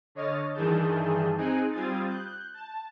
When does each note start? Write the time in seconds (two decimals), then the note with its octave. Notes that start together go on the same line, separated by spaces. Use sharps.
0.15 D3 C#5 D#5 F6 A6
0.54 G2 D#3 E3 G#4 A5 G6
1.38 C4 D#4 G#4 G#5 F#6 D7
1.72 G3 C4 F4 D#6 G#6 A6
2.07 F#6 G6
2.54 A5